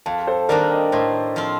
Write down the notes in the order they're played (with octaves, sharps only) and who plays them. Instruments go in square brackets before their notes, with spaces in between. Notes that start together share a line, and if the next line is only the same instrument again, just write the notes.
[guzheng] F2 [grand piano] F5 A5
[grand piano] A4 C5
[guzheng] D#3 G3 A#3 D4 [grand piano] A#4 D5
[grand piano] D#5 G5
[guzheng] A2 [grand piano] C5 D#5
[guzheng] F3 C4 F4